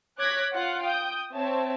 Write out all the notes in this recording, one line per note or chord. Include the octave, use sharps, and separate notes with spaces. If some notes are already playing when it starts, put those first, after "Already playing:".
C#5 D6 F#6 G#6 A#6 B6
F4 F5 F#5
G5 D#6 G6
C4 C#5 E5 A5